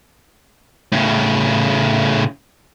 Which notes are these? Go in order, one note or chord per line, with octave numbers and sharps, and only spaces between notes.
A2 C#3